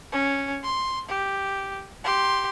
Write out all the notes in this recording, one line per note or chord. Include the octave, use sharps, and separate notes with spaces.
C#4
C6
G4
G4 C6